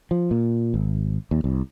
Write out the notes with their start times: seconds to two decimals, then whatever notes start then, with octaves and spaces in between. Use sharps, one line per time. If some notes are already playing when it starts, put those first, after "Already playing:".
0.11 F3
0.31 A#2
0.74 G#1
1.31 D#2
1.44 C2